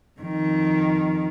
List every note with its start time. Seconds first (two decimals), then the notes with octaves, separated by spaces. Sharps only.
0.20 F2 D#3